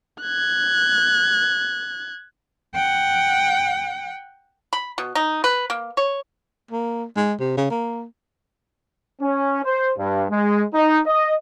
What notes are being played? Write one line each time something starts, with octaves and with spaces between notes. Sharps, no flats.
F#6 G#6
F#5 G5
B5
B2
D#4
B4
A#3
C#5
A#3
G#3
C3
C#3
A#3
C#4
C5
G2
G#3
D#4
D#5